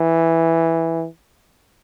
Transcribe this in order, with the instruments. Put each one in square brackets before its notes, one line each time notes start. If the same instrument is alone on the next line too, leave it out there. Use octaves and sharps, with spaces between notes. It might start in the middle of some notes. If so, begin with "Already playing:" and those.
Already playing: [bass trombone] E3